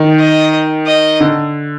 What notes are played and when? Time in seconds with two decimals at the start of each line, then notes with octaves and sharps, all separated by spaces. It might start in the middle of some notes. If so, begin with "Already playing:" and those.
Already playing: D#3
0.19 D#5
0.86 D#5
1.20 D3